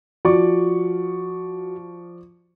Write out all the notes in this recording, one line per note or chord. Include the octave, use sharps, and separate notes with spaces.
F3 F#4 D5 C#6